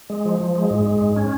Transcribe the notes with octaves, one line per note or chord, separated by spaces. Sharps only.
G#3
F3
F3
G#3
G#2
G#3
G#2
C#4